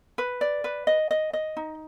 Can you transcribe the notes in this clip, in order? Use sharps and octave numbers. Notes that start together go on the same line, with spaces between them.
B4
D5
B4
D#5
D#5
D#5
D#4